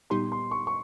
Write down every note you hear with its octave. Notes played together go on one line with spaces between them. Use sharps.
A#2 G3 B3 D#4 G4 C6
C6
C#6
C#6